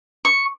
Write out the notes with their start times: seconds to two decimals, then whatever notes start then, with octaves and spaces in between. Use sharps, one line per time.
0.25 C#6